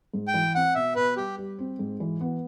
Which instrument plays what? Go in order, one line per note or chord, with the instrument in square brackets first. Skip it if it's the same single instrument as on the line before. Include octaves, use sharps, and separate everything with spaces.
[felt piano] G#2
[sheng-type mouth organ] G5
[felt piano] E3
[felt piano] C4 [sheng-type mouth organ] F#5
[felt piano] B2 [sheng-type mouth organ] E5
[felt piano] B2 [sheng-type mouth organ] B4
[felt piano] G3 [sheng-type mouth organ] G4
[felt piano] G3
C4
G#2
E3
B3